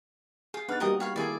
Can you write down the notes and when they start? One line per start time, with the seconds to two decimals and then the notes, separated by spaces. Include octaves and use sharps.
0.54 F4 G#4
0.69 B3 D4 D#4 B4 F#5 F6 A6
0.80 G3 A#3 F#4 G4 A#4 D#5 G5 D#6
1.00 C#5 F5 G5 B5
1.16 D#3 A#3 E4 G#4 A4 D5 G#5